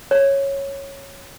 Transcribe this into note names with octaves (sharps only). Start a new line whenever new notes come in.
C#5